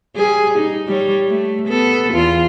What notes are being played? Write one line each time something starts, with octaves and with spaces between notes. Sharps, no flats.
G3 G#4
D#4
G3 C#5
A3
B3 A4
E2 F4